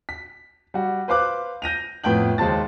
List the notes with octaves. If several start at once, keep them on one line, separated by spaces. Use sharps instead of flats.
B6
G3 F#4
B4 C5 F5 D6 F#6
G6 A#6 D#7 F7
F2 A2 B3 G5 G6 F#7
D#2 G#3 C5 A5 A6